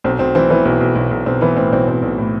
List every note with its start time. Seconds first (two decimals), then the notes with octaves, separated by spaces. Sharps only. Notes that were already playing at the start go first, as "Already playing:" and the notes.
0.04 B1 C4
0.19 B1 C4
0.35 E3 C4
0.50 E3 B3
0.65 B1 C4
0.81 B1
0.95 B1
1.11 B1
1.26 B1 C4
1.41 E3 B3
1.57 A2 C4
1.72 B1 C4
1.87 B1 C4
2.02 B1
2.18 A2